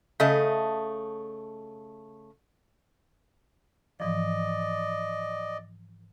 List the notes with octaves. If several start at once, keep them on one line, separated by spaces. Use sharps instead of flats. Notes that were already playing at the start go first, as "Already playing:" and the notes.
C#3 A3 D#5
G#2 E3 F3 D5 D#5